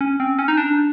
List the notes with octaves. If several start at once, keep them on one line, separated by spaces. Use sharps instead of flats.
C#4
C4
C#4
D#4
D4